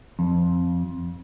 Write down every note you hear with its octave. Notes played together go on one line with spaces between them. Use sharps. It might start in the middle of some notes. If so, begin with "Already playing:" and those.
F2